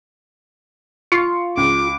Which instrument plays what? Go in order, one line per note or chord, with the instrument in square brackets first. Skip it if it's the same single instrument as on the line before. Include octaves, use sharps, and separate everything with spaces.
[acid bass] F4 [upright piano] C#6 C7 C#7
[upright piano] C#2 [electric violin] D6